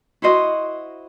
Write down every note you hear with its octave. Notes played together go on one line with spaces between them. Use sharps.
E4 F#4 C5 D#5